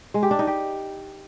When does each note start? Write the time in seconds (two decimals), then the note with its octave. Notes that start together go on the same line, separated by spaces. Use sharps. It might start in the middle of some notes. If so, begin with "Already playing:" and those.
0.14 G#3
0.23 G4
0.31 D4
0.39 D#4
0.47 G4